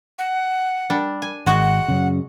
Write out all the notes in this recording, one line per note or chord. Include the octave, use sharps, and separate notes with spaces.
F#5
G3 D4
G#5
G#1 G#3 F#4 F#5
F#2 C#3